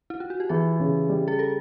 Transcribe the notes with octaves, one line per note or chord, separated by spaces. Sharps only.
E4
F4
F#4
G4
E3 G#4
C#3
G3
G#4
A4